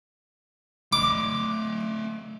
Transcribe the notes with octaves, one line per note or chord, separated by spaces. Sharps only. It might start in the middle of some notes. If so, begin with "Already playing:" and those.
A3 D#5 D6